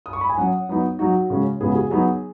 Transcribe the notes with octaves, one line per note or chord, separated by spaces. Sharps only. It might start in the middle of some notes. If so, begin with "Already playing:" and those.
D#6
C#6
B5
G#5
F#3 C#4 F#5
F#3 B3 D#4
F#3 D#4 F#4
C#3 G#3 C#4
C#3 G#3 B3 G#4
F#4
G#4
F#3 B3 D#4 G#4